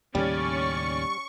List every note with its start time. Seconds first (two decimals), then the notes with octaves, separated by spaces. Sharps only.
0.15 D#2 A2 C#3 G3 C#4 D5 C#6